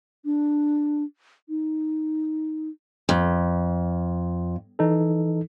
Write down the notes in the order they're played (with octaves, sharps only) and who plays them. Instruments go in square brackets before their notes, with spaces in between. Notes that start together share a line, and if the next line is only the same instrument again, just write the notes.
[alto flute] D4
D#4
[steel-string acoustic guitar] F2
[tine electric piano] E3 D#4 A4